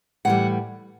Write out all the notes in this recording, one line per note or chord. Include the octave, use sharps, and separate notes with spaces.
A2 E3 G3 F#5